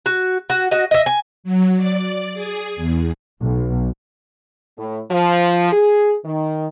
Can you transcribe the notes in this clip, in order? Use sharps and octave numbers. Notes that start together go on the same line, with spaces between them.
F#4
F#4
F#4 D#5
D#5 E5
G#5
F#3
D5
G#4
E2
B1
A2
F3
G#4
D#3